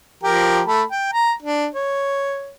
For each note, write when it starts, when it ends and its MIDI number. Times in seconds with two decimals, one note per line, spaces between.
0.24 0.61 53
0.24 0.61 67
0.24 0.61 70
0.67 0.83 57
0.67 0.83 81
0.67 0.83 83
0.91 1.10 79
1.13 1.32 82
1.43 1.67 62
1.75 2.52 73